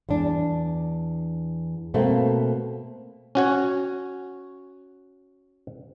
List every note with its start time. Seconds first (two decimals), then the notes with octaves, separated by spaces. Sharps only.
0.09 E2 D4
1.94 B2 A3 A#3 C4
3.35 C#4 F#4 C#5